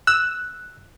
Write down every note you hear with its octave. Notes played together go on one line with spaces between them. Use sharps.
E6 F#6